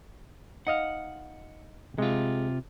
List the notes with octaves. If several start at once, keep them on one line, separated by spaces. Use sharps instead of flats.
D#4 D#5 F5 F#5
C3 G#3 F4